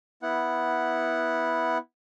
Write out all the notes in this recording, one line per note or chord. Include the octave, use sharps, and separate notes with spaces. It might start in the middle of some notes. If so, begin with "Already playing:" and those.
B3 E4 F#5